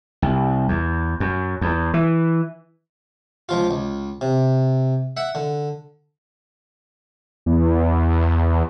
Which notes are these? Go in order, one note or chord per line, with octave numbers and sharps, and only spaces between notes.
C2
E2
F#2
E2
E3
C#2 F3 F4
C#2
C3
E5 F#5
D3
E2